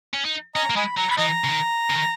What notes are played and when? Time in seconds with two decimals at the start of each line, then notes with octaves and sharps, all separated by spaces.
0.13 C#4
0.25 D#4
0.55 C#4 D#5 A#5
0.70 A#3
0.76 G#3 D#5 G#5 B5
0.97 F#3 A#5
1.10 B5
1.18 E3 D#5 A#5
1.44 C#3
1.49 D#3
1.90 C#3
1.95 D#3